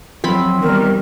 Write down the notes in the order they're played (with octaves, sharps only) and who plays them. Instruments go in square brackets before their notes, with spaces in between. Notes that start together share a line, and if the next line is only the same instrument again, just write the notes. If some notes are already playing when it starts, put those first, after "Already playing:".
[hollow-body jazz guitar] F#2 F3 [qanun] C4 B5
[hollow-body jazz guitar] E2 B2 [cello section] D#3 G3 [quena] A#4